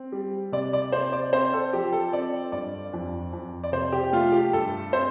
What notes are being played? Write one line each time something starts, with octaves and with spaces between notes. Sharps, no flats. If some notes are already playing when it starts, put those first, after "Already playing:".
Already playing: C4
G3
C3 D5
D5
C3 C5
D5
C4 C5
A4
F3 G4
A4
C4 D5
G2 D5
F2
F2
D5
C3 C5
G4
A3 F4
G4
G2 A4
C4 C5